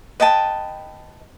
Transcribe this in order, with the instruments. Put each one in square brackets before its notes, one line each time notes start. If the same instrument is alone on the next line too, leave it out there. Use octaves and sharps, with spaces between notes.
[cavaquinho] B4 D#5 G5 A5